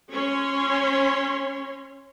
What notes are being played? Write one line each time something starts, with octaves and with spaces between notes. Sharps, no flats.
C#4 C#5 C6